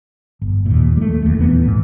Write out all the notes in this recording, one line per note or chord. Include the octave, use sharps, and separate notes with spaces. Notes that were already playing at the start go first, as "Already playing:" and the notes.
G1
D#2 A#2
G3 A3
E1 D#2
D#1 E3 B3
A#1 G#2